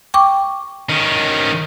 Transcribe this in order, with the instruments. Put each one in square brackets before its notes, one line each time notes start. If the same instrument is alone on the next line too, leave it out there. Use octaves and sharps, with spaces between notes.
[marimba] G5 C#6 D6
[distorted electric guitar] D#3 C#4